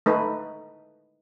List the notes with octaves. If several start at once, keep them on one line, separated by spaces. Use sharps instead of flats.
A3 D#4 B4